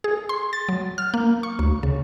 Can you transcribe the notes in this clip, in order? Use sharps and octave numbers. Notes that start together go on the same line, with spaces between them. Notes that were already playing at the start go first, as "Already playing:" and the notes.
G#4
C6
A6
F#3
F6
A#3
C#6
D2
C#3